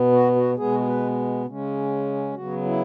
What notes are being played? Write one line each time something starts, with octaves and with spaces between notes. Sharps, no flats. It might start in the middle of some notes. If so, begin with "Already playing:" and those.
Already playing: B2 B3
F#4
F#4
B2 G#3 B3 G#4
F#4
G#4
B4
C#3 G#3 C#4
C#3 F#3 B3 F#4
E4